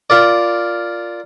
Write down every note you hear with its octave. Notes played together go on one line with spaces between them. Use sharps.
F4 A#4 D5